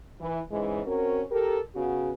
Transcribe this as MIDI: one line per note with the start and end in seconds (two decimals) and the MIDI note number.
0.20 0.39 52
0.51 0.81 44
0.51 0.81 49
0.51 0.81 52
0.51 0.81 56
0.87 1.22 60
0.87 1.22 61
0.87 1.22 66
0.87 1.22 70
1.31 1.58 67
1.31 1.58 69
1.31 1.58 70
1.75 2.12 49
1.75 2.12 59
1.75 2.12 66